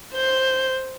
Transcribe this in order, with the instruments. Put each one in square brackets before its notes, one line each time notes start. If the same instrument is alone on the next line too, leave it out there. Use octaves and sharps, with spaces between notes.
[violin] C5 G6